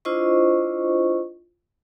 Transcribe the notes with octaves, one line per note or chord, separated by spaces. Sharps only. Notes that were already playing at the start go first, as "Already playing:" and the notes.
D4 E4 F4 C5 D#5 C#6